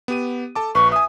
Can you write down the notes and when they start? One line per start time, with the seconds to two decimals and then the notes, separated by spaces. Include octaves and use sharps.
0.08 B3 G4 D#7
0.55 A4 A5 D6
0.75 A#1 B4 C#6
0.92 E5 G#5 D#6